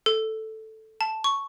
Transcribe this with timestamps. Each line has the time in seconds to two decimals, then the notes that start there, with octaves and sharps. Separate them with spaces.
0.06 A4
1.01 A5
1.24 C#6